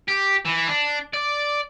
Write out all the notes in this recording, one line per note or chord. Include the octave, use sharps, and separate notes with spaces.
G4
E3
D4
D5